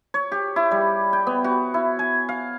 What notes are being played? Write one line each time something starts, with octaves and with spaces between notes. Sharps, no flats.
C#5
G4
E4
G3
G5
B3
F#4
E4
G#5
F5